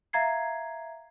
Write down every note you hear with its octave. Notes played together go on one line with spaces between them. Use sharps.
E5 F5 A#5 G#6 C7